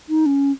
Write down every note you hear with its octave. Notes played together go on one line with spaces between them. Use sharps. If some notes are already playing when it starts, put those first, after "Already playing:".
D#4
C#4